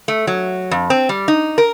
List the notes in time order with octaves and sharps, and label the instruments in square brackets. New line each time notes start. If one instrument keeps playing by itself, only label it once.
[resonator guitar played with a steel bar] A3
F#3
F2
C4
G3
D#4
A#4